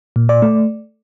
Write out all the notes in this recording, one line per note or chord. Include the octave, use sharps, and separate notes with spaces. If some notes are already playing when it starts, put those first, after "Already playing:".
A#2
D5
A3